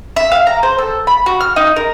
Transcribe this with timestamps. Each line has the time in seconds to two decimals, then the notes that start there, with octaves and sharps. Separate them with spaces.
0.16 E5
0.32 F5
0.47 A#5
0.63 C5
0.78 A4
1.07 B5
1.26 F#4
1.41 F6
1.56 D#4
1.76 A#4